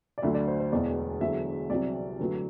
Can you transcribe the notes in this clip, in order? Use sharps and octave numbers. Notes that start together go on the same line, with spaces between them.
D5
D2 D3 F#3 E5
D5
C5
C5
E1 E2 B2 D5
E1 E2 D3 F#3 E5
C2 C3 F#3 D5
D2 D3 F#3 B4